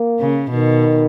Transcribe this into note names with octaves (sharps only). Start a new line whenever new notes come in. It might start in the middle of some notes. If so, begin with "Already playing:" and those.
Already playing: A#3
C#3
B2 D#3